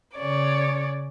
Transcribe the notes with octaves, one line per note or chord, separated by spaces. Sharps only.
C#3 C#5 D5